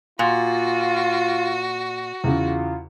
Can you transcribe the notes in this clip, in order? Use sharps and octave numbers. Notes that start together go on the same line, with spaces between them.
A#2 F4 F#4
E2 C#3 F4